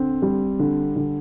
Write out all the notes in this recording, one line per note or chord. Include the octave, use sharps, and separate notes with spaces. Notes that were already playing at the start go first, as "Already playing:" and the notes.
Already playing: D3 C4
G3
D3
D3